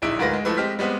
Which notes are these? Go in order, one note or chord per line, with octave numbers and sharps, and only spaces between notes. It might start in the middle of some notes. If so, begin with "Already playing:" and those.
D1 A#1 D#4 E4 D7
D2 G#2 F4 A#4 B4 A#6
G#3
F3 A3 E4 B4
G#3 C4 G4 F6 B6
G3 G#3 B3 C4